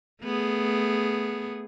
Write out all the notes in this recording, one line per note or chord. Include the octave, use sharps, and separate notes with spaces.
A3 B3 G#4